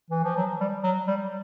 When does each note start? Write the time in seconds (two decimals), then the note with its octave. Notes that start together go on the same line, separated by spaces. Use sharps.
0.11 E3
0.24 F3
0.37 F#3
0.60 G3
0.83 F#3
1.07 G3